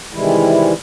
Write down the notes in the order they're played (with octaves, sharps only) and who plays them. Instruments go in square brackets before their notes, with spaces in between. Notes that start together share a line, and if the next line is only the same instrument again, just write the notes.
[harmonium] C3 D#3 E3 G3 G#3 E4